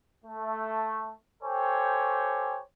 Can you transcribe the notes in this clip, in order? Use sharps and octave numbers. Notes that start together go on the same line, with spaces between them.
A3
G4 A4 C5 C#5 G5 G#5